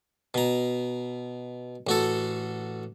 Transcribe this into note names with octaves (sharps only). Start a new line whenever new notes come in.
B2 A#5
A1 F#4 A4